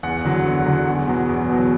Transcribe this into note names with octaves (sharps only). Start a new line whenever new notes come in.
E2 F#5
D3 F#3
E2
D3 F#3
E2
B2 F#3
E2
B2 F#3